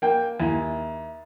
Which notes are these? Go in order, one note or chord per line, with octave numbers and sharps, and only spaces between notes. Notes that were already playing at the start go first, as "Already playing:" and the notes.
A#3 G5
D#2 E4 G#5